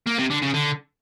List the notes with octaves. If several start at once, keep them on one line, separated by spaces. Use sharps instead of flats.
A#3
C3
D3
C#3
D3